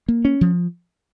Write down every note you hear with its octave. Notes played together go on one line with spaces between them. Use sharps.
A#3
C#4
F3